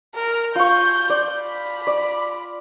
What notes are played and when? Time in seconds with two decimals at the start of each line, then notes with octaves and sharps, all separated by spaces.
0.15 A#4
0.56 F4 C#6 G6
1.10 D5
1.42 B5
1.87 D5